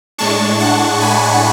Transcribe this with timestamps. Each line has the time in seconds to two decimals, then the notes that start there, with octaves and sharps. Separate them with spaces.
0.18 A2 G#3 D4 A5 C#6
0.59 F#5 A5
1.01 G#5 B5